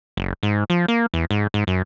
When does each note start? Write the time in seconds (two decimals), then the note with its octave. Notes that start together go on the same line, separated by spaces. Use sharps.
0.17 F#1
0.43 G#2
0.70 F3
0.88 A#3
1.14 E2
1.31 G#2
1.54 G#2
1.67 F#2